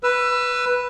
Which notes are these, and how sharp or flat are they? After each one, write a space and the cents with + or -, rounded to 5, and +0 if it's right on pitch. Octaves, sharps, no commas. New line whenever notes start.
B4 +0 E6 +25